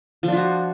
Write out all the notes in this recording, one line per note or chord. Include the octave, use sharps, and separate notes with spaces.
F3 D4 F4 F#4